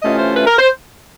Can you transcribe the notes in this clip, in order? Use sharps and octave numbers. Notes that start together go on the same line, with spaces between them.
C3 E3 A3 C#4 F4 D#5
C5
B4
A#4
C5